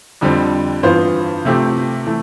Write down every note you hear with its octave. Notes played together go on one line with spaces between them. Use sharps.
F2 D3 G3 C4
G2 E3 B3 F4 C5
C3 F3 A3 C4 G4
E3 A3